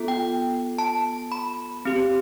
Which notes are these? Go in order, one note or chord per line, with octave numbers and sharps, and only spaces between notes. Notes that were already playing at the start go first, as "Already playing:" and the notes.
Already playing: B3 F4 A4
G5
A5
B5
C4 G4